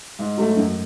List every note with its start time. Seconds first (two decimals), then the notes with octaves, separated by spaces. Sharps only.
0.19 G#2
0.38 F#3 A3
0.57 F#2